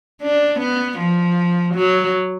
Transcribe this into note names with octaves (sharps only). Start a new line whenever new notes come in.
D4
B3
F3
F#3